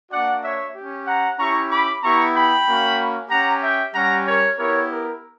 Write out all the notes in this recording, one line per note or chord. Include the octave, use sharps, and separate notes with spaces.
A#3 D4 F#4 D5 F#5
C#5 E5
C#4 G4
F#5 A#5
C#4 E4 G4 A#5 C#6
B5 D6
B3 E4 G4 A#5 C#6
G5 B5
A#3 C#4 F#4
C#4 G4 F#5 A#5
E5 G5
G3 C#4 G4 F#5 A#5
A#4 C#5
B3 E4 G4 A#4 C#5
A#4